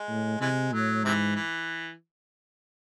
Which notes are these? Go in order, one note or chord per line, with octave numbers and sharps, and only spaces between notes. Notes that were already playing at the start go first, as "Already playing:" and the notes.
Already playing: G#3
A2
C3 E3 G#3
A2 F#3
G#2 C3 E3
E3